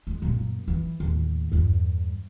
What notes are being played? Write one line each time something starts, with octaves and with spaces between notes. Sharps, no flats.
G#3
F#2 A#2
E3
D#2 A2
E2 G2